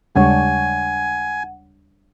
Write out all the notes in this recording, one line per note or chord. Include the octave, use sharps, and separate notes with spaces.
D#2 C#3 G3 G#3 D4 C#5 F#5 G#5